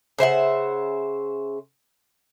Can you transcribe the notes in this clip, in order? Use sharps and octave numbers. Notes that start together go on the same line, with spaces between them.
C#3 C5 E5 F#5